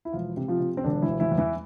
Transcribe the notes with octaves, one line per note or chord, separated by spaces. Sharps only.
E4
E1 F3 F4
C3
F3 F4
C3
C4
E1 D3 D4
E3 E4
E1
E3 E4
E2
E3 E4